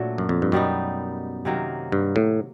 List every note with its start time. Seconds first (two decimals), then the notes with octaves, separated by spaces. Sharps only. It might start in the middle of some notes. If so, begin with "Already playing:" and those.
Already playing: A#2 F#3 A3 D4
0.18 F#2
0.29 F2
0.42 G2
0.52 F#2 B2 G3 B3 D#4
1.45 C3 D#3 F#3 A#3
1.92 G2
2.16 A2